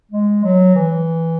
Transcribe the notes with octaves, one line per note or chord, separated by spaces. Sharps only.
G#3
F#3
E3